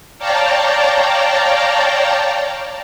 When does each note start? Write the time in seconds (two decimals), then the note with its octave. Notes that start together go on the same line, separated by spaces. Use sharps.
0.18 C#5 D5 F5 G5 A5 A#5